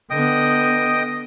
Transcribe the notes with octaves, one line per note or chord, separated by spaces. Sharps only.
D3 B3 D#5 G5 D#6